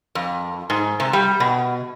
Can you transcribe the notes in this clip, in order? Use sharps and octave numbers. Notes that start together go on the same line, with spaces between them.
F2
G#2
C3
G3
B2